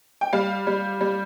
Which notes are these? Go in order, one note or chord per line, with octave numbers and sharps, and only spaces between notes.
G5
G3 F5
G3
G3